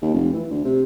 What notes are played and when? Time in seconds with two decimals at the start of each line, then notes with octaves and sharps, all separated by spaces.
0.02 D#2
0.14 F1
0.34 E3
0.51 D2
0.65 C3